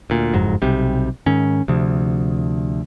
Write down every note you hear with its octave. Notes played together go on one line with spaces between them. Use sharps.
D2 A#2
F#1 F2 G#2 F#3
B1 C3 G3
G#2 D#3 C#4
D2 C3 F3